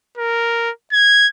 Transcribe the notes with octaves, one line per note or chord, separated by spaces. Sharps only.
A#4
G#6